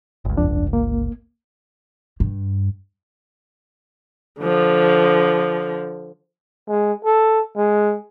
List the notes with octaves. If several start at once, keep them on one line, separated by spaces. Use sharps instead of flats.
G1 C#2
F2 D4
A#3
G2
D3 F3
G#3
A4
G#3